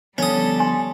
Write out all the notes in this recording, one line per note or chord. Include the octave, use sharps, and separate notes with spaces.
D3 F3 G3 B3 C#4 A4 D#6
G#5 C6